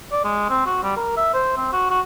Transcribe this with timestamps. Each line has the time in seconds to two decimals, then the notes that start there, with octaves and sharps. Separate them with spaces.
0.12 D5
0.25 G#3
0.49 C4
0.67 F#4
0.83 G3
0.97 A#4
1.17 E5
1.34 C5
1.57 C4
1.73 F#4
1.91 F#4